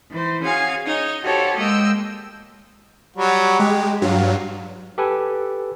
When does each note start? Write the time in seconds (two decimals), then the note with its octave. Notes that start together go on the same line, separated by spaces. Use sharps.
0.12 E3 C5
0.43 C#4 F#4 G#4 F5 G#5
0.86 D#4 C#5 D#5
1.23 F#4 G4 A4 C5 C#5 F5
1.57 G#3 A#3 D#5 G5 E6
3.16 F#3 G3 F#4
3.59 G#3 G4
4.02 G2 F#3 F4
4.98 G4 A4 B4 G#5